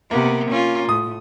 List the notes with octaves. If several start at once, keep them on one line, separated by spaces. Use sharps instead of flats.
C3 A#3 B3
C#4 F4
A2 D#6